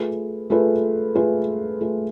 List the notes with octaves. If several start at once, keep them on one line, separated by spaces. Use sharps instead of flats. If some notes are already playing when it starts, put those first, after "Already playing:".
Already playing: A3 F4 G#4 B4
A3 F4 G#4 B4
A3 F4 G#4 B4
A3 F4 G#4 B4